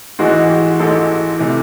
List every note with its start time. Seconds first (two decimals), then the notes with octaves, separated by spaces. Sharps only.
0.19 A1 G#2 E3 G#3 F#4
0.50 G4
0.79 A1 G#2 E3 G#3 A4
1.39 C3 E3 A3